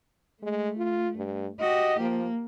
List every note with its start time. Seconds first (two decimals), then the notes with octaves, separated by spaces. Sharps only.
0.43 G#3 A3
0.78 F4
1.17 G2
1.60 F#4 G4 D#5
1.99 F3 A#3